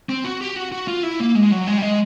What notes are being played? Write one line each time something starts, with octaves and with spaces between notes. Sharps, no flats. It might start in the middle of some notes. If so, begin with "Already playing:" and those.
C4
F#4
G4
F#4
F#4
F4
E4
A#3
G#3
F#3
G#3
G3
G#3